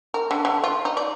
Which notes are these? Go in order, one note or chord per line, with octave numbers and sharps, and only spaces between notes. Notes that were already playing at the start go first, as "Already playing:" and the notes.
A#4
D3
D3
F4
D#4
D5